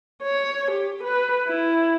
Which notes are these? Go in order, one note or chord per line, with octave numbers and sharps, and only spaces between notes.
C#5
G4
B4
E4